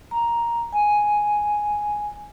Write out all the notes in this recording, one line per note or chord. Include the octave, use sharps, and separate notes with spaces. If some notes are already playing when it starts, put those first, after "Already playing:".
A#5
G#5